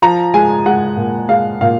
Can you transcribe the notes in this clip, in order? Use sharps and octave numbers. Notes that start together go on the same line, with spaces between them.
F3 A#5
G#3 G#5
G#3 F#5
A#2
G#3 F5
A#2 F5